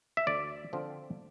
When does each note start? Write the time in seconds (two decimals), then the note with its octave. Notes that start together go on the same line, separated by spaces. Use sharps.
0.17 E5
0.27 D2 D5
0.73 D3 F3 C4 F4